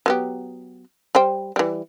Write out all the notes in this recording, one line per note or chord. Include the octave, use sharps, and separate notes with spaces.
F#3 B3 G4
G3 C5 G5
E3 G3